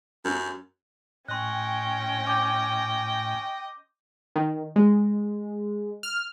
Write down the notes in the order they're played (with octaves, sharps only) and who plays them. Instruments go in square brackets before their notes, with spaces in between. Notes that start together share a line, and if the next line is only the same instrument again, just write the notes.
[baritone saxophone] F#2
[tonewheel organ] A2 [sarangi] C#4 [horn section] D#5 G5 [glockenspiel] C6 F#6
[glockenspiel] D6 G6 A#6
[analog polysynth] D#3
G#3
F6